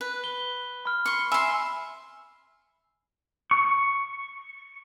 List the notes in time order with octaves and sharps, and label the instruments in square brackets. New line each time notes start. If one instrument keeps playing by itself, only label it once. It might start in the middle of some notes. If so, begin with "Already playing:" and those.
[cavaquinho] B4
[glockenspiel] G7
B5 F6
[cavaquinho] C6 C#6
[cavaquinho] E5 C6 [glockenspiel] G#5 B5
[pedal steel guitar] C#6